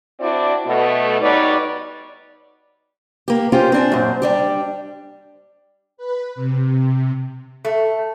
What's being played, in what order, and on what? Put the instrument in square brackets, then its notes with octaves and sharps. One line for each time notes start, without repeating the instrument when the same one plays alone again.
[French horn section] C4 D4 E4 F#4 D5
B2 A3
B2 G3 D#4 B4 C#5 D5
[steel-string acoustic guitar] A#3 G4
[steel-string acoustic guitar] C#4 F4 G4 [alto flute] C5
[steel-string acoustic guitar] C4 D4 G#5
F#2 A#2
G3 D4 G4
[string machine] B4
C3
[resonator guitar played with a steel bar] A3